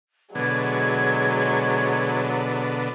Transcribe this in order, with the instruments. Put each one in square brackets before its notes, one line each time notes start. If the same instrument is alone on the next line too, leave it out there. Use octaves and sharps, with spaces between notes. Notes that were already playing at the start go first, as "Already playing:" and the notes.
[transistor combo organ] B2 D3 [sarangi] F#3 [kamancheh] G#3 C#5 [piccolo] G#6